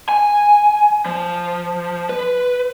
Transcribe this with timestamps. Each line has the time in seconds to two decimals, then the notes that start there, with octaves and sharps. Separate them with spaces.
0.09 G#5
1.05 F3
2.09 B4